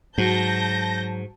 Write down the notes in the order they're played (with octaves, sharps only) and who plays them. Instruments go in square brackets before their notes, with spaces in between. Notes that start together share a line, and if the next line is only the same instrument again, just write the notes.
[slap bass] G#2 [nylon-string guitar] F#3 [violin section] A5 G6 A#6